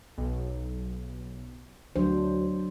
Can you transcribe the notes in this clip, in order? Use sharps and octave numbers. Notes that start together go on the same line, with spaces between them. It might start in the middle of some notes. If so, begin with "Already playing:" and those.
B1
D2 F#3 D4 C5